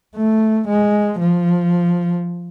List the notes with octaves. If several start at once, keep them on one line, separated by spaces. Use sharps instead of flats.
A3
G#3
F3